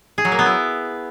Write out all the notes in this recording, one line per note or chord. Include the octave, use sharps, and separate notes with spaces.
G#4
F#3
A#3
B3
E4